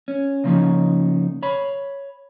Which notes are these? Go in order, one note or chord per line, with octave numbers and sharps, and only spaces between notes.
C#4
C#3 F3 A#3 C#4 D#4
C#5 B5